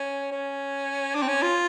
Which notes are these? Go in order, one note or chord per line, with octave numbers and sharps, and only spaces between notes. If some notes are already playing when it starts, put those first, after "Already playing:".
Already playing: C#4
C#4
D4
C4
C#4
F4